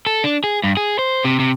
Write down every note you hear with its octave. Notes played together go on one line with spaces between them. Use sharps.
A4
D4
G#4
G2
G#4
C5
C3
C3